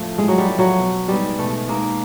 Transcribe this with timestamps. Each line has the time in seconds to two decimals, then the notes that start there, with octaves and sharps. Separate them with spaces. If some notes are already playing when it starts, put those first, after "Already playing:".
Already playing: A2 F3 A3
0.18 A2 G#3
0.28 F#3
0.38 G3
0.49 F3 A3
0.59 F#3
0.78 B2
1.08 G3 G#3 B3 D#4
1.39 B2 A3
1.68 G#3 A#3 B3 D#4